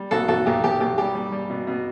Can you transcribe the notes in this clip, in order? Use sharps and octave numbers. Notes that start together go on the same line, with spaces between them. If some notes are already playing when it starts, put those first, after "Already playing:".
Already playing: G3
B1 F#4 A4
B1 F#4 A4
B1 G4
B1 G4
B1 G4
G3 G4
G3
G3
B2
B2